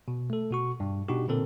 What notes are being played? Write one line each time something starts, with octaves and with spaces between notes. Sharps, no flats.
B2
A3 A4
B2 F#4 C#6
G2
B2 D4 D#4 F#4 G4
A#2 D3 C4 A4 A#4